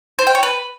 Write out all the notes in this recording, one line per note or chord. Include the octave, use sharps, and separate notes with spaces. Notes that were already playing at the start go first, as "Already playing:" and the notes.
C5
G5
C#5
B4